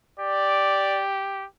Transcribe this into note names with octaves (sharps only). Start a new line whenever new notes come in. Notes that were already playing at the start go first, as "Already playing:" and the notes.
G4 D5